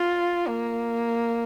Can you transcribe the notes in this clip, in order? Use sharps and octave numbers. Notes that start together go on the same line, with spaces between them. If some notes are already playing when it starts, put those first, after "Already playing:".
Already playing: F4
A#3